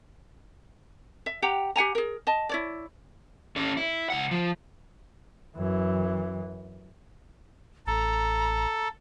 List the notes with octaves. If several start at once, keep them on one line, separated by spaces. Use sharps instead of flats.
E5
G4 F#5 G5 A#5
G4 F#5 G#5 A#5
G#4 A#4
D#5 A5
E4 C#5 D5
C#4 A4
E4
C#2 F#5
F3
F#2 E3
A1 A4 A#5